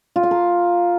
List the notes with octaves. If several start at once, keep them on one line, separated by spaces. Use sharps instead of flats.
F4
F5
A#4